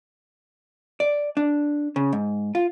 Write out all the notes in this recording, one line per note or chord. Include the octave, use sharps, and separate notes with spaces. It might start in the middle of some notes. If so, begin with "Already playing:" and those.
D5
D4
C#3
G#2
F4